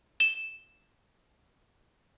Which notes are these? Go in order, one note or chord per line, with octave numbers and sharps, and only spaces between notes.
E7 G7